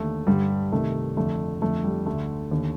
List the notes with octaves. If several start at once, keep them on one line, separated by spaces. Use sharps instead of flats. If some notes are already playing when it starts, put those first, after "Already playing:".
Already playing: D#2 D3 A3
G2 D3 G3
C2 C3 D#3 A3
F2 D3 A3
F2 D3 A3
G3
D2 D3 A3
D#2 D3